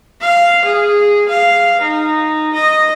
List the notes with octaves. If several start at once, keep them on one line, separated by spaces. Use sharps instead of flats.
F5
G#4
F5
D#4
D#5